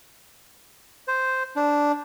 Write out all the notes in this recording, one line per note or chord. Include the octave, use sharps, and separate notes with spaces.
C5
D4